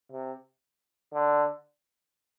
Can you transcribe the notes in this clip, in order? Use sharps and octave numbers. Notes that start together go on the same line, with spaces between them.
C3
D3